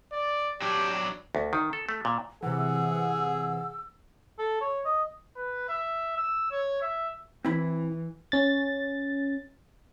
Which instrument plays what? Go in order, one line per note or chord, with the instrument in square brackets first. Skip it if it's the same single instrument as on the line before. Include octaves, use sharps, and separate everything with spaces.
[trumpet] D5
[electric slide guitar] F#3 D4 [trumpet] G4
[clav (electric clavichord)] D2
D#3
A4
A3
A#2
[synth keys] C3 E3 [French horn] G#4 [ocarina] F#5 [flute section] E6
[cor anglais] A4
C#5
D#5
[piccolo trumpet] B4
E5
E6
C#5
E5
[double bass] E3 [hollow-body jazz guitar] C4 E4 B5
[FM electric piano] C#4 A6